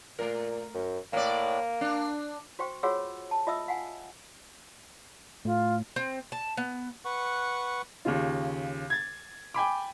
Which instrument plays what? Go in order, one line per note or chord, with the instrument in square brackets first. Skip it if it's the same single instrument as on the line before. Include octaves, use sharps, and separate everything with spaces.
[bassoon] A#2 [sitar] A3 A#4
[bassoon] F#2
[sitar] A2 D5 [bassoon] A#3
[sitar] D4
[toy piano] F#4 C5 G5 C#6
F4 F#4 G#4 C#5 F#5 E6
A5
F4 D#5 E5 D#6 E6
F5 F#5 G#5
[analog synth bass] A2 [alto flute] F4
[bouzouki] C4
A5
B3
[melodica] B4 F#5 C#6
[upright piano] D#2 C#3 F4
G#6 A6
G5 G#5 B5 D6